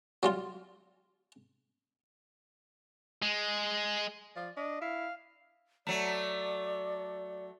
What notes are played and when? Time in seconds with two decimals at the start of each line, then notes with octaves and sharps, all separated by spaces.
0.23 F#3 G3 F4
3.22 G#3
4.36 F3 D5
4.56 D4 D#5
4.81 E4 F5
5.87 F#3 A3 D5